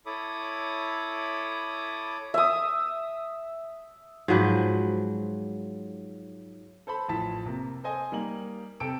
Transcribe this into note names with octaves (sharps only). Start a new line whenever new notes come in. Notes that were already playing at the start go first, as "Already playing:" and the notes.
E4 A4 C#5 B5 D6 D#6
E5 D#6
G#2 F3 F#3 B4
A4 C5 A5 B5
A1 F3 A5 B6
C3 A#3
A4 C5 D#5 G#5
G3 A#3 D#4 F#7
C3 A4 G5 E6 D7